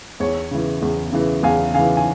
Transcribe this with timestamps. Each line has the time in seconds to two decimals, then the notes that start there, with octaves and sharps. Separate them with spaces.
0.20 E2 C#5
0.51 C#3 E3
0.82 E2
1.12 C#3 E3
1.43 E2 F5 G#5
1.74 C#3 E3 F5 G#5
1.97 G#5